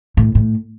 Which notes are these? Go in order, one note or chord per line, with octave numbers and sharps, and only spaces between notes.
A2
A2